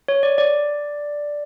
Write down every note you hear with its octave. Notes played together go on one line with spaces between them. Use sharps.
C#5
D5
D5